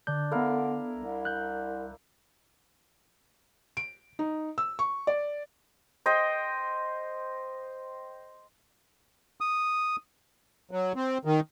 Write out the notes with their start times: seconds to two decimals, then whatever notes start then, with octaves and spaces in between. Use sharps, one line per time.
0.07 D3 D4 G6
0.31 D3 B3 E4 A4 A#4 F5
0.96 C2
1.25 F#6 G6
3.77 D7
4.19 D#4
4.58 E6
4.79 C#6
5.07 D5
6.06 C5 D#5 G5
9.41 D#6
10.71 F#3
10.96 C4
11.25 D#3